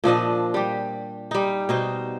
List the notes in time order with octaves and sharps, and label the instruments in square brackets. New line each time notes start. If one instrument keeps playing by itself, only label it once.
[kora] A#2 F3 D4 D#5
G3 G4
G3 D#4
B2 D#4 C5